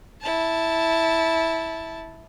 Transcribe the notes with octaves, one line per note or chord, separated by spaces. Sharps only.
E4 A5